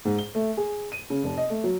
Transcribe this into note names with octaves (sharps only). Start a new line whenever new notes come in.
G#2
G7
A3
G#4
D#7
C#3
F1
D#5
A3
F#3